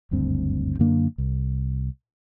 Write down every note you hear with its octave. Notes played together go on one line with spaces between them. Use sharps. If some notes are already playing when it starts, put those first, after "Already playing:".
F#1 D2 G2 C4
F#2 D3 A#3 D4
C2